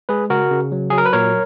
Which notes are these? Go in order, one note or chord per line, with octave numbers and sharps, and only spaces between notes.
G#3 G#4 B4
C#3 F#4 A#4
C#3
F#3
F#3 G#4
A#4
B4
A#2 A#4 C#5